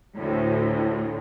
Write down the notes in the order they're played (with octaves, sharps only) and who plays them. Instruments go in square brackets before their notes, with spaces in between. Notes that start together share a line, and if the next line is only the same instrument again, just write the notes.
[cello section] D2 A2